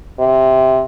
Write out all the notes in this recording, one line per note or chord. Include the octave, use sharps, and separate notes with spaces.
C3